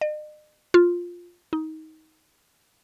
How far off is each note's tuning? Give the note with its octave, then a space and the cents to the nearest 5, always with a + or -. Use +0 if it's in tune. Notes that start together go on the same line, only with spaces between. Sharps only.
D#5 -45
F4 +5
D#4 +20